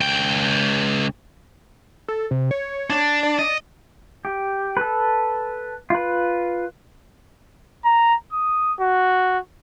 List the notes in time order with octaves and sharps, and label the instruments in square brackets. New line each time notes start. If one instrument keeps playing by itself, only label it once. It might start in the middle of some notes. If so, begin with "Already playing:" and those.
[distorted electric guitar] C#2 G5
[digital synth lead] A4
C3
C#5
[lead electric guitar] D4
[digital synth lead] D5
[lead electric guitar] D#5
[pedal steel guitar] G4
A4 B4
F4 B4
[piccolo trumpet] A#5
D#6
F#4